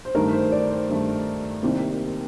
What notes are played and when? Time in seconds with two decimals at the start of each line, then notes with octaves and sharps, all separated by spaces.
0.05 C5
0.14 G2 D#3 A3 A#4
0.33 C5
0.52 D5
0.71 C5
0.89 G2 D#3 A3
1.62 C2 C3 D#3 A#3